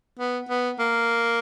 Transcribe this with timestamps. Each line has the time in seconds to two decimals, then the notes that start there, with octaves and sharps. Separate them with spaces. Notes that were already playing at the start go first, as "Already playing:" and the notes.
0.19 B3
0.49 B3
0.79 A#3